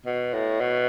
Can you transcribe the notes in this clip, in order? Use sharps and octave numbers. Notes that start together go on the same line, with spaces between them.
B2
A2
B2